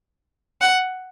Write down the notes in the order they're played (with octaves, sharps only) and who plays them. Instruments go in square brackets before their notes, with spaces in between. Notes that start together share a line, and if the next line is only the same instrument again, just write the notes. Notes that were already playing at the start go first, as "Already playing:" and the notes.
[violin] F#5